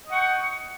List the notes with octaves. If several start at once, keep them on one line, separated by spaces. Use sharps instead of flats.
D#5 F#5 G5 C#6